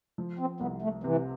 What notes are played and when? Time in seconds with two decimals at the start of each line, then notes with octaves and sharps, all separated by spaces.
0.18 F3
0.39 C4
0.60 C2 B3
0.82 A3
1.04 C3 E3